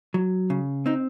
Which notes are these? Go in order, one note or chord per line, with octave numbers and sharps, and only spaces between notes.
F#3
C#3
C4 D#4